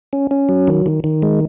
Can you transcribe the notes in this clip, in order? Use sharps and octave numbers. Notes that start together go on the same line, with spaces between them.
C#4
C#4
F#3
D#3
D#3
D#3
G#3